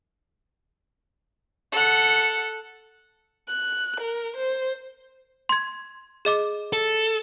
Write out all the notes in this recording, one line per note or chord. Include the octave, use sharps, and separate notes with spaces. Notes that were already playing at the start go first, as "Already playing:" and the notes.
A4 F#5
F#6
A#4
C5
C6 G#6
G#4 D#5 D6
A4